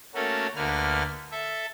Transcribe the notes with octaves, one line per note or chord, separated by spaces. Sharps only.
A3 A#3 C#4 F#4 A4
D2 D3 A#3 B4 F6
A4 E5